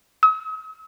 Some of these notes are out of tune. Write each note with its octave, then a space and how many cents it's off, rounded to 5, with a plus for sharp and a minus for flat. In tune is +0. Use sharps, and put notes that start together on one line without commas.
D#6 +45